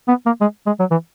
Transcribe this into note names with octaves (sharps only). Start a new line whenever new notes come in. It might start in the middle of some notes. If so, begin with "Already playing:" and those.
B3
A#3
G#3
G#3
F#3
E3